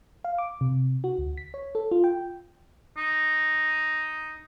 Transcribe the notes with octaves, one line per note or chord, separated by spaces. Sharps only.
F5
D6
C3
F#4
D2
B6
C#5
A4
F4
G5
D#4